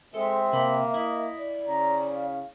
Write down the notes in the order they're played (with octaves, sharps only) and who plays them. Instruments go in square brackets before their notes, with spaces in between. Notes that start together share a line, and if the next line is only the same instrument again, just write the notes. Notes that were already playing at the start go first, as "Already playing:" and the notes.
[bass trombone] G#3 [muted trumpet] C4 [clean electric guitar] A4 [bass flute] E5
[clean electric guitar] C3 D#5 B5 [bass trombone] A#3
[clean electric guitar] E4 [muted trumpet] D#5
[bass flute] D5
[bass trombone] C#3 [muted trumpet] A#5
[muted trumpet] F5